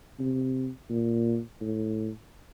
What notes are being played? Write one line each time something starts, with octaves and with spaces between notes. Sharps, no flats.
C3
A#2
A2